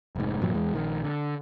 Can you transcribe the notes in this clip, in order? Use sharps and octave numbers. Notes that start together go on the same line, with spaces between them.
F1 G#2
G2 A#2 F3 F#3
E2 E3 G#3
A#1 D#3
D3